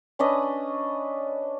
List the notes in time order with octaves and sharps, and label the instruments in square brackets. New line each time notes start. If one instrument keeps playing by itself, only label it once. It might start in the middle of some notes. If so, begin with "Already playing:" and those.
[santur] C#4 D4 B4 D#5